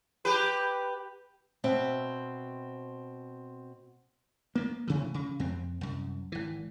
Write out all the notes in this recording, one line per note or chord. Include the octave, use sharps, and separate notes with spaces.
G4 B4
B2 C4 E5
A#3 B3
A1 C3 E3
C#3
F2 C4
C2 F#2
G#1 E3